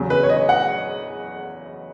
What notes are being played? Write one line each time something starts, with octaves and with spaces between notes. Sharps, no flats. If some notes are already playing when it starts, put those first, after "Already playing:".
Already playing: E2 C#3 F#3
B4
C#5
D#5
F#5